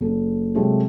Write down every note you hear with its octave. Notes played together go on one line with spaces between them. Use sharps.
F#1 A4
C3 F#3 G#3 A3 C4 G4